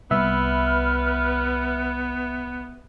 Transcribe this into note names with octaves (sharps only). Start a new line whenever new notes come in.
C2 B3 B4 E5 F6